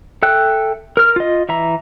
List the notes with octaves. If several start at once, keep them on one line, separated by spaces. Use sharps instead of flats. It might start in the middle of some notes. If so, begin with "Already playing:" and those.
A4 E5 G5 F#6
A#4 F6
F4 D#5
E3 E5 A#5